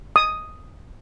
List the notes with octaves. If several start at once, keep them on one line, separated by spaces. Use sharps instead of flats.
D#6